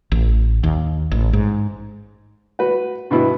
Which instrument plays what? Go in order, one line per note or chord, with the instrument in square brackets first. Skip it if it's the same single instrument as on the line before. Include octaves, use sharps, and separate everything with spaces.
[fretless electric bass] A1
D#2
A1
G#2
[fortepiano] F#4 B4
G2 B2 B3 E4